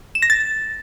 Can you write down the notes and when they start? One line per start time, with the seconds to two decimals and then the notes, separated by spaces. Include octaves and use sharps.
0.15 E7
0.22 A#6
0.30 A6